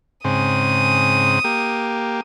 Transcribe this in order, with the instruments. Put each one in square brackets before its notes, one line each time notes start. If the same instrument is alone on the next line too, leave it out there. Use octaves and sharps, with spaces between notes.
[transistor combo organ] G#2 C#3 C4 [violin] D#6
[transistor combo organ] A#3 G4